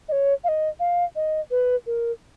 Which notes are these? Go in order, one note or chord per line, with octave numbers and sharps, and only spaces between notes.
D#5
C#5
F5
D#5
F5
D#5
B4
A#4